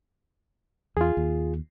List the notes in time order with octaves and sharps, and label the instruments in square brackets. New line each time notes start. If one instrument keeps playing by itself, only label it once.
[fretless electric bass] E2 [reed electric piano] F4 G#4
[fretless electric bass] D#2